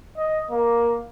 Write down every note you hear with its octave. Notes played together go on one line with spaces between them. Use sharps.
D#5
A#3